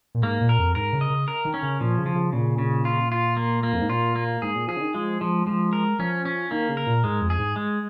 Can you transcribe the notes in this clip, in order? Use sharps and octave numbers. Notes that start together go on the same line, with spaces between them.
A#2
G#2 A#3
A#2
A#4
F2
G#2 A#4
C#3
D#5
C#3
A#4
D#3
C#4
C#3
A#2 F3
C#3
F3
C#3
A#2 C#3
C#3
F4
F4
A#3
A#3
F2
G#2
A#2 F4
A#3
G#2 G#4
A#2
F3 G#4
C#3
D#3
F3 G#3
F3 G#3
F3 G#3
A#4
F3 C#4
C#4
D#3 A#3
C#3
A#4
A#2
G#2 G#3
F2
G#4
G#2
G#3